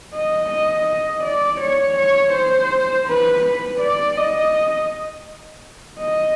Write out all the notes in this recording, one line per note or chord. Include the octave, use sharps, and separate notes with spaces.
D#5
D#5
D#5
D5
C#5
C#5
C5
B4
B4
D5
D#5
D#5